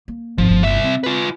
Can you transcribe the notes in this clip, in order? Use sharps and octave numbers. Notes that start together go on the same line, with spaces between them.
A#3
G#1 F3
G1 A2
C2 E5
C4
F4 B4